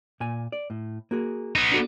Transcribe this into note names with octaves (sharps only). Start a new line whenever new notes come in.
A#2 G#5
D5
A2
A#3 F#4 G#4
B3 D#4
D4 F#4 A4